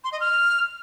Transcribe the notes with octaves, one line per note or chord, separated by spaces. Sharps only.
C6
D#5
F6